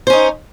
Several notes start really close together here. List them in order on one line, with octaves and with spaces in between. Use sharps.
C5 C#4 D#4